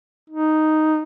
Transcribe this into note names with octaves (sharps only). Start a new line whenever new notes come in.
D#4